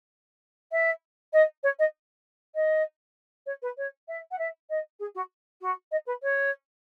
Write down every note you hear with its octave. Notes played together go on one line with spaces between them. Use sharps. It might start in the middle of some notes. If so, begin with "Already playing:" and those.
E5
D#5
C#5
D#5
D#5
C#5
B4
C#5
E5
F#5
E5
D#5
G#4
F#4
F#4
D#5
B4
C#5